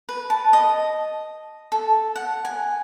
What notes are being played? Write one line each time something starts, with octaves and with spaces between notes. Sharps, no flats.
B4
A5
D#5
A4
F#5
G#5